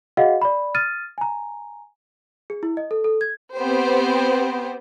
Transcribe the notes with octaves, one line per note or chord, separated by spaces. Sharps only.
F#4 G#4 D#5 F5 F#5
D5 B5
D#6 F6 A6 D#7
G#5 A#5
G#4
E4
D#5
A4
A4
G#6
B3 C4 G4 C5